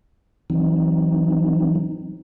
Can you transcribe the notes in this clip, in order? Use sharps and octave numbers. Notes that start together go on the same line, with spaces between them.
E3 F#3 C4 D#4